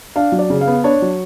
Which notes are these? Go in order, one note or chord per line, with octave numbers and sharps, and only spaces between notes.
D4 F5
F#3
D5
C#3
F5
B3
D4 C#5
F#3